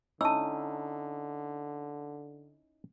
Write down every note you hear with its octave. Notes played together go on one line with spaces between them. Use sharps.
D3 C#4 D#4 E4 A5 E6